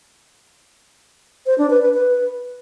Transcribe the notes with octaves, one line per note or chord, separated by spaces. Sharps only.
C5
D4
B4
B4
B4